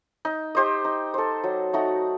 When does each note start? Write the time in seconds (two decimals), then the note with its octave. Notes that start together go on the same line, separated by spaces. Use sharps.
0.25 D#4
0.55 G4 C5 D#5
0.85 D#4
1.14 A4 C5
1.44 F#3
1.73 A3 D#4 F#4